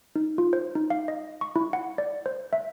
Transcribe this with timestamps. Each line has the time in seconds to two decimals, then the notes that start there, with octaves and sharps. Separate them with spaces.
0.16 D#4
0.38 F4
0.53 C5
0.75 D#4
0.90 F5
1.08 D#5
1.41 C#6
1.56 E4
1.73 F#5
1.98 D5
2.26 C5
2.53 E5